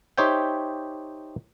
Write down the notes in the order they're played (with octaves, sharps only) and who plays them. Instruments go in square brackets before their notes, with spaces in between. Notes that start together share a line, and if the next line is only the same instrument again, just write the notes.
[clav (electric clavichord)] D#4 G4 C5 C#5 E5 G5